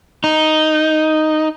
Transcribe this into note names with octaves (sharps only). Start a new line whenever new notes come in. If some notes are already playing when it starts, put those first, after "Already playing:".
D#4